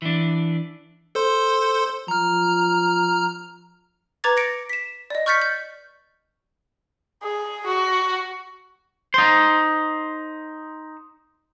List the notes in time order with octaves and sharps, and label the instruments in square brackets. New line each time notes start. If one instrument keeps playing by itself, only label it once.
[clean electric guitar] E3 D4
[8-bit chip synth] A4 C5 C6
[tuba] F3 [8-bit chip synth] A#5 F6
[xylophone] B4 A#5 D6 G#6 A6
A#6 C#7 D7
B6 E7
D5 D#5
C#6 F6 G6 A6 B6 C#7
G6
[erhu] G#4
F#4
[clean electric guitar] D#4 C5